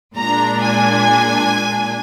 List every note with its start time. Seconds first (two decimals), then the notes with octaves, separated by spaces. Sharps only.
0.17 A#2 G#3 D4 A#5
0.61 G#5